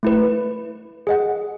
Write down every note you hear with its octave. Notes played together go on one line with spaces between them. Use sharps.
A3 E4 B4
G#4 D#5 F#5